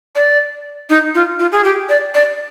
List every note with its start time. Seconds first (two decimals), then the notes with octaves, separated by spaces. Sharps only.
0.15 D5
0.90 D#4
1.15 F4
1.39 F4
1.52 G#4
1.64 G4
1.89 D5
2.14 D5